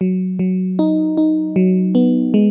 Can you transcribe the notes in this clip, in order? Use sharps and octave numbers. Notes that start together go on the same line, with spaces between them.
F#3
F#3
D#4
D#4
F#3
B3
G#3